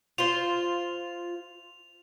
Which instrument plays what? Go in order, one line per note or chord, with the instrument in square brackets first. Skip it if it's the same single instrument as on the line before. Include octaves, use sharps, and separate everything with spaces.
[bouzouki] F4 C5 [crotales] F7